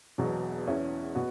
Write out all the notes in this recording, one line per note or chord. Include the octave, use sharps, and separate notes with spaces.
E1 E2 B2 F#3
E2 E3 C#4 E4
B2 B3 F#4